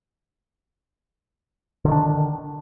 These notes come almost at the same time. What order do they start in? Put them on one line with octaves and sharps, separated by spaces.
D3 D#3 D4